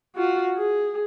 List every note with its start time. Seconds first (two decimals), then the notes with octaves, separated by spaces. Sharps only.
0.16 F4 F#4
0.57 G#4